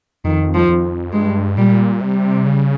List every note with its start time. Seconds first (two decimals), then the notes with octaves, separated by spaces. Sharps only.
0.25 F2 D#3
0.54 F3
0.69 F2
1.12 G2 G#3
1.58 A#2 G3
2.01 C3 G3
2.46 C#3